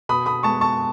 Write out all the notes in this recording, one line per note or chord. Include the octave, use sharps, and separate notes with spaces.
B2 B5 D#6
B5 D#6
G#3 B3 A5 C#6
A5 C#6